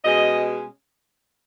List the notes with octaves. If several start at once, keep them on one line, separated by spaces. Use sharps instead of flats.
B2 G#3 C#4 D#5